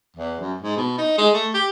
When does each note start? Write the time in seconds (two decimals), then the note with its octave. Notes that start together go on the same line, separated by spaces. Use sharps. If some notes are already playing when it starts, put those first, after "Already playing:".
0.16 E2
0.40 F#2
0.62 G#2
0.77 B2
0.98 D#4
1.18 G#3
1.34 A3
1.54 G4